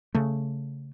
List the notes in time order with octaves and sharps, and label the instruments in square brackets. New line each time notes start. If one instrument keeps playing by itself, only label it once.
[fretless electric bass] C#3 A3